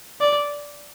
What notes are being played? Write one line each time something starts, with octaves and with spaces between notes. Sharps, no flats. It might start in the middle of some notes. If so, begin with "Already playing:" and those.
D5